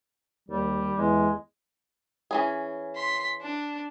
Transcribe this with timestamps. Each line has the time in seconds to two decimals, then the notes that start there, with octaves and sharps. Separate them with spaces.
0.49 D#2 G3
0.98 E2 G#3
2.31 E3 C#4 G#4
2.96 C6 B6
3.42 D4